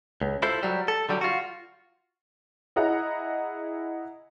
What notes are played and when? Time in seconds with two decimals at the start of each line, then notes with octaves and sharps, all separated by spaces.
0.21 C#2
0.42 E4 F4 A4 C5
0.63 F#3 G3
0.88 A4
1.09 D3 F#3 G3
1.21 F4 F#4
2.76 E4 G#4 D#5 F#5 A#5